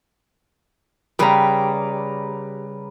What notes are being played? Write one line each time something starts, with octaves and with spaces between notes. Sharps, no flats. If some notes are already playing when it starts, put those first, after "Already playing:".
C#3 G3 B4 A#5